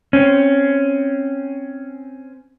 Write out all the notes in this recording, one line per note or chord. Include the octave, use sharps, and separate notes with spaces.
C4 C#4